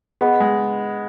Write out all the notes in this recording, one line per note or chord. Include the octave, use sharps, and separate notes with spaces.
B3 G#4 D#5 F#5 B5
G#3